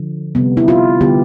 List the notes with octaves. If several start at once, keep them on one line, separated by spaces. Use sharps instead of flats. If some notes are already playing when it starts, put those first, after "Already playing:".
Already playing: D3 F3
C3 G3 B3
E4
F4
D3 G3 B3 G4